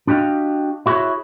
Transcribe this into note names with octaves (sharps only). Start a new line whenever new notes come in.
D4 F#4 G4 D#5 F5
E4 F#4 G#4 C5 C#5 E5